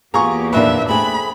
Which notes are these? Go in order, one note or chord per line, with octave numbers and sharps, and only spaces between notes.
E2 A#3 B3 F4 G4 G#4 A#5 C#6
F2 A#2 D#3 D4 B4 E5
A3 C4 G#4 B5